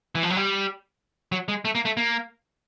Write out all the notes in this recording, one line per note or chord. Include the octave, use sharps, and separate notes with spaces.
E3
F3
F#3
G3
F#3
G#3
A3
A#3
A3
A#3